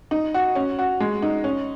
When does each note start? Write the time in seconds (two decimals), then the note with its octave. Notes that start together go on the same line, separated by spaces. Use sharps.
0.11 D#4
0.34 F#4
0.55 C#4
0.79 F#4
1.00 G#3
1.22 D#4
1.44 C#4